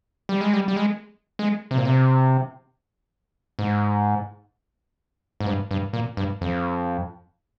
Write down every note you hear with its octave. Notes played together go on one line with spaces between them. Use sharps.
G3
G#3
G3
G3
G#3
G#3
C3
A#2
C3
G#2
G#2
G2
G2
A#2
G2
F2